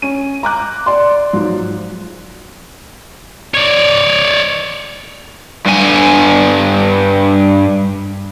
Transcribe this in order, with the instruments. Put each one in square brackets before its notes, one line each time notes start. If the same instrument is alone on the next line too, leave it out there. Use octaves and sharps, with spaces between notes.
[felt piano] C#4 D#7
A#5 D6 F#6
D5 C6
G#2 F3 F#3
[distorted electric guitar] C#5 D5
[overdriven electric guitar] G2 G#5